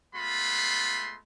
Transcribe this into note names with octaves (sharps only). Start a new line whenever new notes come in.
G#3 A3 B3 F4 B5 C6